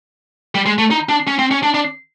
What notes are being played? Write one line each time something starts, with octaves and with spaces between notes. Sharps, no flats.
G3
G#3
A3
D#4
D4
C#4
C4
C#4
D4
D4